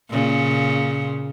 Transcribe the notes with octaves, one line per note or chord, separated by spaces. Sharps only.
A#2 C#3